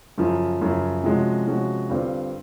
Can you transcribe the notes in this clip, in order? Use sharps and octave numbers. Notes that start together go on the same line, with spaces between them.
F#2 C#3 F3
F#2 C#3 F3
C3 F3 G#3 C#4 F#4
C3 F3 G#3 C#4 F#4
G2 D3 G3 C4 F4